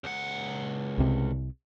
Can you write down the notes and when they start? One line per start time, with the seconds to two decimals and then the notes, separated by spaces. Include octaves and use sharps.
0.04 C#2 F#5
0.98 C2 C3